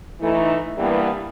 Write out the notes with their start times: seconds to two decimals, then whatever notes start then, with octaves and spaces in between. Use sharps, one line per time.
0.21 E3 A3 D#4
0.77 G2 E3 G3 A#3 B3